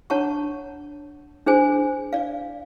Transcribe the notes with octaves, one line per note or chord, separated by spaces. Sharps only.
D4 C#5 F#5 A5 A#5 C#6
D4 G#4 C5 G#5
D5 F5